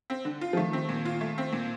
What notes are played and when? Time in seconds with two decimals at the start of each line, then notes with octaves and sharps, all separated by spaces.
0.10 C4
0.25 D3
0.41 F4
0.53 F3
0.57 D#3 A3
0.73 C4
0.89 A#2
1.05 F4
1.21 A3
1.38 C4
1.53 A#2